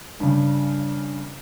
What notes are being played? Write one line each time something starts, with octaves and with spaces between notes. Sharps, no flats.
G2 C#3